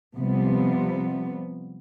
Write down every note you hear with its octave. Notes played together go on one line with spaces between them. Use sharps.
C3 F3 G3 B3